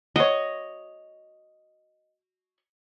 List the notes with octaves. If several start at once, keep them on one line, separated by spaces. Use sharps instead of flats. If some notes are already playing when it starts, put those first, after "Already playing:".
F#4 C#5 D#5